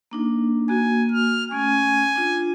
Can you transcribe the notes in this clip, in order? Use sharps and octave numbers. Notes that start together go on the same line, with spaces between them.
A#3 D4 D#4
A#3 F#4 G#5
F6
A3 C#4 G#5
D4 F4